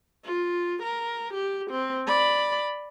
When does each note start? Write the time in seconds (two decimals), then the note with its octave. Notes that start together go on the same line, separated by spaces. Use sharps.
0.24 F4
0.83 A#4
1.34 G4
1.71 C4
2.07 D5 B5